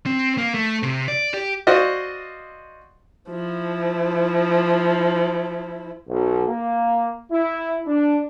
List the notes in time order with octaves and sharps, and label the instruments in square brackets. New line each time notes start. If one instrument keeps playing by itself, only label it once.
[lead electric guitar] C4
A#3
A3
C3
D5
G4
[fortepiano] F#4 C5 D5 D#5 F5
[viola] F3 E4
[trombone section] B1
A#3
E4
D4